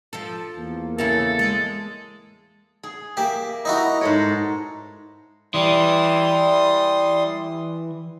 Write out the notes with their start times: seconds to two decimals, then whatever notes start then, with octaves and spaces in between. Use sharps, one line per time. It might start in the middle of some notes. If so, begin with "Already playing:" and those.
0.13 F3 A4
0.56 E2 A#3
0.98 C#3 E4 A4 A#4
1.39 G#3
2.83 G#4
3.17 A#3 G4 E5
3.65 D#4 E4 F#4 A#5
4.01 G#2 A4 C#5
5.54 E3 G3 C6 D#6